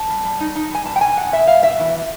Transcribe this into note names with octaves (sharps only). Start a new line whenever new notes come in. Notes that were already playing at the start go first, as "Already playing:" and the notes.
Already playing: A5
G3
G3
D#4
D#4
G3 G#5
B2 A5
G5
B2 G#5
B2 F#5
B2 E5
G3 F5
B2 E5
E3